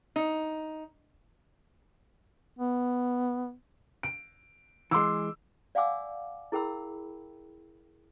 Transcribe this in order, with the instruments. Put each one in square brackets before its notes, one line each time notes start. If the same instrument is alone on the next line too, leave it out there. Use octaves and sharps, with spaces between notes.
[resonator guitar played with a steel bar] D#4
[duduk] B3
[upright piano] D7
[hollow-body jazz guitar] E3 G#3 [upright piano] C6 D6 E6
[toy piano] D5 F5 F#5 G#5 D6 E6
E4 G#4 A#4 G5 B5 E6